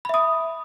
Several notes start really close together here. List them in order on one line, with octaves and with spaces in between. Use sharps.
B5 E5 D#6